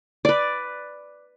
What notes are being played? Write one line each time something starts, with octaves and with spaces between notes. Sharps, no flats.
B4 D5